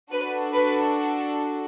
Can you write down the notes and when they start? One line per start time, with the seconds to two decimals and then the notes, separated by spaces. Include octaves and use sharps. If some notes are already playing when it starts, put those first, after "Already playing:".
0.11 D4 F#4 A4 B4
0.54 B4